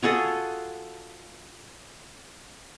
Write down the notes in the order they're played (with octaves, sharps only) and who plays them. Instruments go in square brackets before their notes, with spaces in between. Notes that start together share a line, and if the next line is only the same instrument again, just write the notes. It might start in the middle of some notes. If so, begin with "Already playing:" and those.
[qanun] F4 F#4 G#4 A4